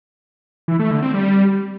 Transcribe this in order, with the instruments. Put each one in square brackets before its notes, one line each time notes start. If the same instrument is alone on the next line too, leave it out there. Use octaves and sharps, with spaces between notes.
[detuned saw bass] E3
A3
D3
C4
G3